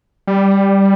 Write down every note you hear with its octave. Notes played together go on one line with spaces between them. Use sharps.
G3